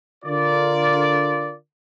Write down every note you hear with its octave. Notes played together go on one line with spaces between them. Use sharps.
D3 F4 A#4 D5